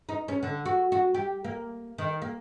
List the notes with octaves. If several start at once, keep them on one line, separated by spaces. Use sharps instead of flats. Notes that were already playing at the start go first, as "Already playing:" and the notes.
D#4
C#4
D3
F#4
F#4
G4
A#3
D#3
A#3